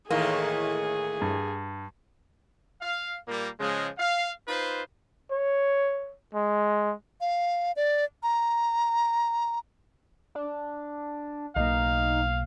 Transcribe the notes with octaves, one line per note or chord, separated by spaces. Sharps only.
A2 D#3 E3 A#3 G#4
G2
F5
A#2 G3 A#3
C#3 F3 G#3
F5
D#4 F4 B4 C5
C#5
G#3
F5
D5
A#5
D4
B1 B2 A#3 D#4 F5